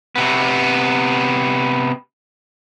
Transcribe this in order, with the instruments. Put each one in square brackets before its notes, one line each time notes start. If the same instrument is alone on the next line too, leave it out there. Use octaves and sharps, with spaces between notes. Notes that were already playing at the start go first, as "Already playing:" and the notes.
[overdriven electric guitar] C3 B3